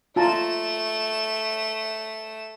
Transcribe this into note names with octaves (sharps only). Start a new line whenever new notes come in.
A3 F4 A5 A#5 E7